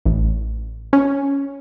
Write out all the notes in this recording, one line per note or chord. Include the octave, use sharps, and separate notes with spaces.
A1
C#4